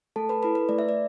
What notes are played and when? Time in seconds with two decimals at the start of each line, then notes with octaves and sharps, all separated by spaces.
0.16 A3 A4 A5
0.29 B4 B5
0.42 E4 A4 B4 B5
0.55 B4
0.69 A3 D5
0.79 E5
0.89 D5